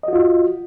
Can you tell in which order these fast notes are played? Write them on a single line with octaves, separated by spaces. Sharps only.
D#5 F#4 F4